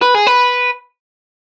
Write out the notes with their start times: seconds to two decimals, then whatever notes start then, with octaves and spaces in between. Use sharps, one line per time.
0.01 B4
0.14 G#4
0.26 B4